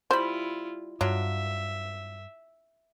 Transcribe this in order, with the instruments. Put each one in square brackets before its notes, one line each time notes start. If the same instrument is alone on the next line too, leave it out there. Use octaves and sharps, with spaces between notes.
[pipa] G3 B5 [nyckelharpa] E4 F4 [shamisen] C5
[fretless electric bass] G2 [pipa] F#3 D4 F4 [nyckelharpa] E5